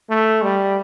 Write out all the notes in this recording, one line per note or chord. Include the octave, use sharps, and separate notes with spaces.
A3
G3